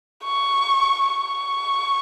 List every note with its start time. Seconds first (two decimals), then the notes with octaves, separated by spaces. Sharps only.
0.24 C#6
1.06 C#6